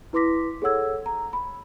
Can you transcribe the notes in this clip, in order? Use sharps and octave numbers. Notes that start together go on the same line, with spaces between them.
E4 B4 C6 D6 A#6 B6
G#4 A4 C#5 F#5 E6 G#6
A#5
B5